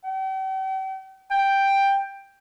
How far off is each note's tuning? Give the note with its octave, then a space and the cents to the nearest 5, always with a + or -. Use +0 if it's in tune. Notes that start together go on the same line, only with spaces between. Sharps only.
G5 -45
G5 +5